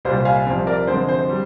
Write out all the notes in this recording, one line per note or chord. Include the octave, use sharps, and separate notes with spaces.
C2 A#2 G3 C5
F5 G#5
C2 C3 F3 C4
A#4 D5
F2 D3 G#3 C4 C5
C5
G3